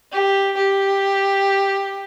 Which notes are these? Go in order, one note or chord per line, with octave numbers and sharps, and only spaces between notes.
G4
G4